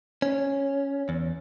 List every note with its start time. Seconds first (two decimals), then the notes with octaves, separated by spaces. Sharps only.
0.22 C#4
1.09 E2